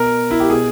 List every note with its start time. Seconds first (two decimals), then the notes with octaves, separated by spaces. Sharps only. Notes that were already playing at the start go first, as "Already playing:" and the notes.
Already playing: B2 A#4
0.31 E4
0.40 G4
0.49 B2 G#4